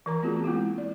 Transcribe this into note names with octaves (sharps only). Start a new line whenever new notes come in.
E3 A#4 A#5
A3 B3 C4 F4 F#4 G#4
G#3 A#3 E4 F4
D5